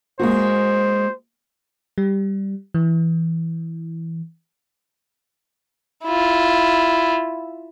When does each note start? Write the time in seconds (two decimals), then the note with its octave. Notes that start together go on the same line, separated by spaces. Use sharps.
0.19 G#3 A#3 F#4 C5
1.98 G3
2.74 E3
6.05 E4 F4